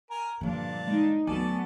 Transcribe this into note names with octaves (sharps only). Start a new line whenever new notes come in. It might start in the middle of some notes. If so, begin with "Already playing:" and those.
A#4 G#5 A#5
G2 A#2 D3 F3 D4 F5
G#3 D#4
D2 F#3 B3 A4 D5 G#5